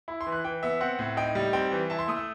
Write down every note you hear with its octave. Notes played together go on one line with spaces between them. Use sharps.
E4 B5
C6
E3
F#6
E3 G5
B3 E5
C4 F#5
A2
D#4 G5
G3
C4 G5
E3
E4 A5
C6
A3 D#6
E6